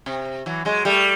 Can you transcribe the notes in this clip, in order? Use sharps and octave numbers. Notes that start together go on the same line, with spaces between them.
C3
E3 F#3
F#3 G#3
G3 A3